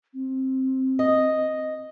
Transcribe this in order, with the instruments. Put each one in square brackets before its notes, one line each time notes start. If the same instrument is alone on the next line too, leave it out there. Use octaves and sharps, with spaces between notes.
[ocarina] C4
[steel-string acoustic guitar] D#5